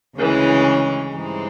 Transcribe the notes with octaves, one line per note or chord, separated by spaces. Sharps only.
D2 C#3 E3 G#3 C#4
G2 E3 G#3 C4 D#4